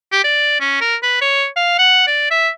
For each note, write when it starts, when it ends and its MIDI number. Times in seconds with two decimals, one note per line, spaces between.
0.12 0.23 67
0.24 0.58 74
0.60 0.81 61
0.81 0.96 70
1.03 1.20 71
1.21 1.46 73
1.56 1.75 77
1.79 2.05 78
2.07 2.28 74
2.31 2.49 76